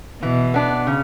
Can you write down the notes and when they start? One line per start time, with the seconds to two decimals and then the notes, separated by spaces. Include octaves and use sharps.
0.22 B2 E3
0.54 B3 D4
0.87 C#3